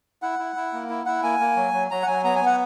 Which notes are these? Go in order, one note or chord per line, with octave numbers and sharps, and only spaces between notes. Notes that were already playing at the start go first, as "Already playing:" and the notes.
E4 F#5
E4
E4
A#3
E4
E4 F#5
A#3 G#5
A#3
F#3
F#3
F#3 A#5
F#5
F#3 G#5
B3 A#5
G#5
B3
F#5